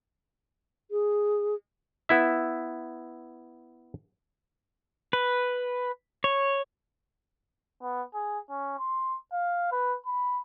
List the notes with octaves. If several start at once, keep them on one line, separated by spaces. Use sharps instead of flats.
G#4
B3 E4 E5
B4
C#5
B3
G#4
C#4
C6
F5
B4
B5